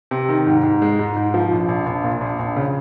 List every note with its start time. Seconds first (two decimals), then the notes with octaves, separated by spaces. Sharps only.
0.11 C3
0.29 D#3
0.47 G#2
0.63 G#2
0.82 G#3
0.99 G#2
1.17 G#2
1.34 F3
1.51 A#1
1.68 A#1
1.86 A#1
2.04 A#2
2.21 A#1
2.39 A#1
2.56 C#3